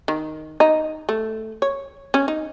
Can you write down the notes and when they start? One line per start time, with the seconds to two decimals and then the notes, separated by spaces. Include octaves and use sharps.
0.08 D#3
0.60 D#4
1.09 A3
1.62 C#5
2.14 C#4
2.28 D#4